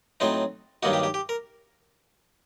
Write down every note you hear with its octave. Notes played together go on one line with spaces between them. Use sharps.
A2 F#3 C4 D#4 A4
G2 D#3 F#3 A#3 D#4 F#4
G4
G4
G4
A#4